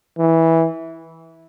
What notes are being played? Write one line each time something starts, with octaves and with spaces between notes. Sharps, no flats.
E3